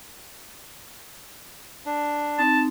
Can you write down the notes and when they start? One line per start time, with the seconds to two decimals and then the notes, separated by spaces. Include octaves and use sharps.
1.86 D4
2.38 C4 D#4 A5